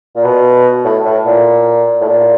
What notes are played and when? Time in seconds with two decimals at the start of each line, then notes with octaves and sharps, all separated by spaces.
0.15 A#2
0.24 B2
0.85 A2
1.05 A2
1.26 A#2
2.01 A2
2.08 A#2